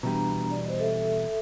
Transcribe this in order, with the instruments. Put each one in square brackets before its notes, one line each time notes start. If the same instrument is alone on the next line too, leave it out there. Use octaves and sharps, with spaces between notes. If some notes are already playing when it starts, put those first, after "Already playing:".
[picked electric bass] B2 E3 G3 [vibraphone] B3 D4 A#5
[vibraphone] D5
C5 D#5
A4 E5